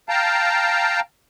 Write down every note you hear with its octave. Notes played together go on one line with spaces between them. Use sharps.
F5 G5 A5 A#5